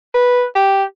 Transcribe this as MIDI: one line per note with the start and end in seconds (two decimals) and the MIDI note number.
0.14 0.44 71
0.55 0.83 67